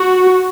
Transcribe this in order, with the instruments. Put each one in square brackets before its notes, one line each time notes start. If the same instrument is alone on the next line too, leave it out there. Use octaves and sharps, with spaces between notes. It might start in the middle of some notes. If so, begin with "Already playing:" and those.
Already playing: [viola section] F#4